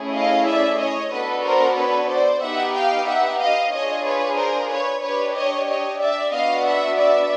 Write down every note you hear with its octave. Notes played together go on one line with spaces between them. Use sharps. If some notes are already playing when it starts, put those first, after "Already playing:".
Already playing: A3 C#4 E4 G#4
D#5 F5
D5 E5
C#5 D#5
B3 D4 F#4 A4 B4
A#4 C5
B4 C#5
C5 D5
B3 D#4 G4 E5 F#5
F5 G5
E5 F#5
D#5 F5
D4 F4 G#4 C#5 D#5
B4 C#5
A#4 C5
B4 C#5
D4 G4 B4 C#5
C#5 D#5
C#5 D#5
D5 E5
B3 D4 F#4 D#5 F5
E5 F#5
D5 E5